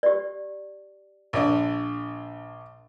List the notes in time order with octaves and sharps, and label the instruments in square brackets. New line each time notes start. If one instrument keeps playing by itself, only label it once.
[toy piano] G4 D5
[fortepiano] A#1 D4